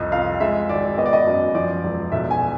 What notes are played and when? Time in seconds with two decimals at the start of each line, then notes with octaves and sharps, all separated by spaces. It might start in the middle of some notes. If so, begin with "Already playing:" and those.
Already playing: C2 F2 D#5
0.12 F2 F5
0.40 G#3 E5
0.69 G#1 D5
0.98 B3 D#5
1.06 D5
1.13 D#5
1.27 F#2
1.55 F3 D5
1.84 E1
2.12 B1 E5
2.31 G#5